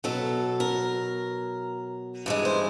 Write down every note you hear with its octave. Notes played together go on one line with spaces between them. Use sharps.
B2 F#3 A4
A#4
G2 E3 G#3
C5